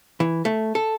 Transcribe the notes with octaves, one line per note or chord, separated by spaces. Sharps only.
E3
A3
A4